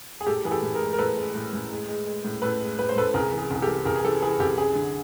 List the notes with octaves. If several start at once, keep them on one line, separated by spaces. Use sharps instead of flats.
G#4
A2 G4 A4
E3 G#4
G4 A4
A2
G#4 A#4
G#3
A#4
A2 A4 B4
G#3
A2
A2
G#3
G#3
G#3
A2
A2 A4 B4
G#3
A2 B4
C5
A2 A4 B4
C2 G#4 A#4
E3
G#4
C2 G#4
G4 A4
E3
C2 G#4 A#4
G#4
E3 G4 A4
E3 G#4
C2 G4 A4
F#2 G#4
D3